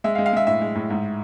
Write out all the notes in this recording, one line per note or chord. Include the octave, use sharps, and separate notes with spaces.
G#3 E5
F5
G#3
F5
G#3 E5
A2 E5
G#3
A2
G#2